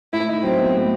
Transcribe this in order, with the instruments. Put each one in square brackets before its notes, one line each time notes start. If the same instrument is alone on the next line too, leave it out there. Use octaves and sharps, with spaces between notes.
[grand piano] A2 [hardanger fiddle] E4
[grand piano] D#4
[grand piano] F#3 [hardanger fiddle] C4
[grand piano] B3
A2